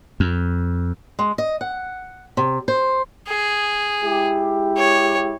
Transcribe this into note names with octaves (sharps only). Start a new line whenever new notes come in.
F2
G#3
D#5
F#5
C3
C5
G#4
G#3 E4 G4
C#5